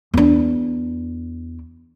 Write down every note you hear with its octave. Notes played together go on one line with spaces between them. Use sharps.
E2 D4